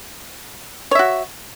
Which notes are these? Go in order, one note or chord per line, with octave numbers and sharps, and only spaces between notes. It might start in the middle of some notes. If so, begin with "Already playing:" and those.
F#4 C#5 E5